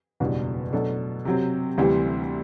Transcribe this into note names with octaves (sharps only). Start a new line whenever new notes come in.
F#1 E2 B2 G3 D4
B2 F#3 A3 D4 A4
C3 F#3 C4
D2 C3 E3 G3